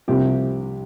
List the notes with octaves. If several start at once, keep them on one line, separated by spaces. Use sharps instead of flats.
C2 C3 F3 G4